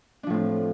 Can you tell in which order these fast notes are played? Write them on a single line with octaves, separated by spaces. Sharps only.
D4 F3 A2 C4